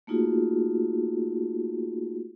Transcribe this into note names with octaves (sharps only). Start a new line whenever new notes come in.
A3 A#3 D#4 F4 F#4 G#4